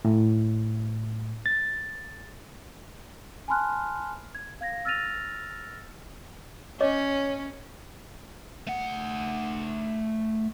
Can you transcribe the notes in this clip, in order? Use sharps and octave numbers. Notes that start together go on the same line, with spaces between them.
A2
A6
G#5 A5 B5 C6 F6 F#6
G#6
F5 G#6 A#6
E6 F6 A6 A#6 D#7 F7
C#4 C#5 D#5 D6
A3 F#5